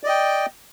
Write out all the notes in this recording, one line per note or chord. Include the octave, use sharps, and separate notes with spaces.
D5 D#5 G5